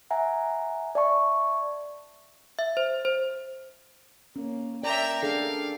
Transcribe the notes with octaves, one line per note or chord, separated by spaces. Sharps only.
E5 F#5 G#5 A#5
D5 E5 A5 C#6
E5
C5
C5
A#3 C#4
A#4 D5 E5 G5 A#5
D4 G#4 A4 F5